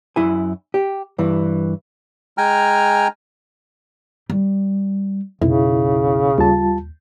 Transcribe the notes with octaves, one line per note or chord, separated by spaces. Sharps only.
F#2 E4 G#5
G4
G2 E3
G#3 G5 G#5 A#5 F6
G3
B1 F2 C#3 E4
D#2 G3 F4 A5